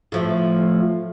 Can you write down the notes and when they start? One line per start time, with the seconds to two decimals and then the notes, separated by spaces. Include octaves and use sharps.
0.12 A2 F3 A3